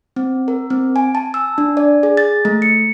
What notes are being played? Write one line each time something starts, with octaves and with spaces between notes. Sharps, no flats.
C4
A#4
C4
G#5
A5
E6
D4
D5
G#4
A6
A3
C#7